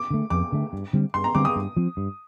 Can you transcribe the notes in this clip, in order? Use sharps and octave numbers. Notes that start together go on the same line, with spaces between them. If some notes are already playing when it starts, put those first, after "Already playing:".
Already playing: D6
D3 A3
F2 D6
D3 A3
G2
D3 G3 C4
G2 C6
A#5
D3 G3 C4 D6
D#6
G2
F3 C4
G2